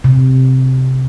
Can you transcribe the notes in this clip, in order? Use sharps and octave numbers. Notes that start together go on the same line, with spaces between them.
C3